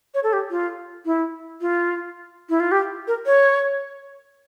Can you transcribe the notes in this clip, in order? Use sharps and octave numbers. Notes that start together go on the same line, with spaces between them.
C#5
A4
G4
F4
E4
F4
E4
F4
G4
A#4
C#5